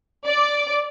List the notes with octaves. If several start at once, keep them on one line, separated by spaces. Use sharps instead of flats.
D5